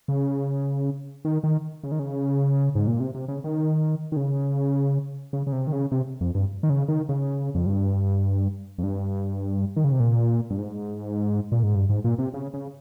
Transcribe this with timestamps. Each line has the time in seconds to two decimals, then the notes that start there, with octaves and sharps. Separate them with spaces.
0.08 C#3
1.25 D#3
1.44 D#3
1.84 C#3
1.92 D#3
1.99 C#3
2.75 G#2
2.87 A#2
3.00 C3
3.15 C3
3.28 C#3
3.44 D#3
4.12 D#3
4.17 C#3
5.33 C#3
5.47 C#3
5.52 C3
5.67 D#3
5.72 C#3
5.92 C3
6.21 F2
6.35 G2
6.63 D#3
6.70 C#3
6.88 D#3
7.09 C#3
7.55 F2
7.66 G2
8.78 F2
8.83 G2
9.76 D#3
9.84 C#3
9.92 C3
10.00 A#2
10.50 G2
10.59 G#2
11.52 A#2
11.63 G#2
11.75 G2
11.89 G#2
12.04 A#2
12.19 C3
12.34 C#3
12.54 C#3